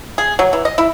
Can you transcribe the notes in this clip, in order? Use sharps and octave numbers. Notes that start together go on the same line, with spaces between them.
G#4
F#3
E3
D#5
E4